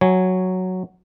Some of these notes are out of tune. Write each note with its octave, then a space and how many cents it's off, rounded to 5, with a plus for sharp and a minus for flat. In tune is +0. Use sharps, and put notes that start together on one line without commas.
F#3 +0 C#5 +0 G#5 +0